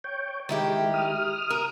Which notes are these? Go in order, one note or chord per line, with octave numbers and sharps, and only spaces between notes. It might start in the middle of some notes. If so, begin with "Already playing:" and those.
C#5 G5
D#3 G#3 E4 G4
D#6 F6
A#4